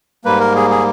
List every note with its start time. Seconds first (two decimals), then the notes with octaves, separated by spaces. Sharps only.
0.25 G#2 G3 A#3 B4
0.40 A#4
0.56 G#4
0.70 G#4